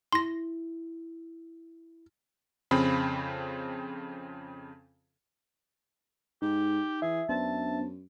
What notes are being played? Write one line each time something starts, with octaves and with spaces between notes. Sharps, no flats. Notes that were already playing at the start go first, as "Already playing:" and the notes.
E4 C6 A#6
F2 C#3 C4 B5
G#2 D#4 G4
E3 G#4 E5
F#2 B3 D4 C5 A5